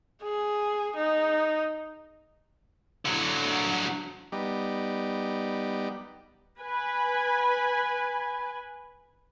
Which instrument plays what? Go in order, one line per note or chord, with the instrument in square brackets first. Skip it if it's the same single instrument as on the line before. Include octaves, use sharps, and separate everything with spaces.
[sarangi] G#4
D#4
[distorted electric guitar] D3 F#3
[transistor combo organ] G3 B3 D#4 G4
[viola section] B4 G#5